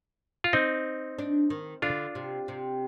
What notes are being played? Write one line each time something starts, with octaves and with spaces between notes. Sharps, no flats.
F4
C4 D#4
D4
D#3
D3 D4 F4
C3
C3